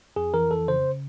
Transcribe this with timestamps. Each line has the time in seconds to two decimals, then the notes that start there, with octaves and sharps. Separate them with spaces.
0.16 F2 G#4
0.34 E3 A#4
0.51 F2 A4
0.68 C#3 C5